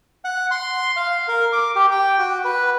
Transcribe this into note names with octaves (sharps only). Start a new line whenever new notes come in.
F#5
C6
F5
A#4
D6
G4
G5
F#4
B4